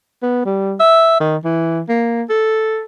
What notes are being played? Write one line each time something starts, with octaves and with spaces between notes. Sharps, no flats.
B3
G3
E5
D#3
E3
A#3
A4